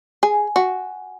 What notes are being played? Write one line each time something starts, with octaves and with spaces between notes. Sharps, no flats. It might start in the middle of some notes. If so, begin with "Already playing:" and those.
G#4 G#5
F#4 F#5